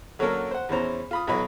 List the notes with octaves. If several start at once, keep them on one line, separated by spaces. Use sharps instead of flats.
D3 F#3 A#3 C#4 A4 A#4
C5 F#5
E2 E3 C#4 C5 A#5
F4 B5 D#6
B1 E3 F#3 D#5 B5